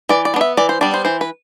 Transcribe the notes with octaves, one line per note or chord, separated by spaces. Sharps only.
E3 D5
D5
B3 D4
E5
E3 D5
C5
G3 B3 D4 D5
C5
E3 C5
B4